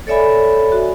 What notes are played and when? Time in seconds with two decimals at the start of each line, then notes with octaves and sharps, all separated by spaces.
0.07 A4 C#5 D5 E5 G#5 B5
0.72 F#4